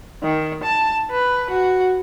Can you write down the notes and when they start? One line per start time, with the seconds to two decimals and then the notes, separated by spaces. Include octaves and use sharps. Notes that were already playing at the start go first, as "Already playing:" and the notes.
0.23 D#3
0.64 A5
1.11 B4
1.50 F#4